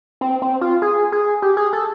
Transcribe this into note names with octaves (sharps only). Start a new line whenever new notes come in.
C4
C4
F4
G#4
G#4
G4
G#4
A4